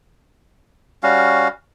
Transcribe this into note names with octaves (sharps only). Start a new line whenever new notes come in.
G3 C#4 F#4 F5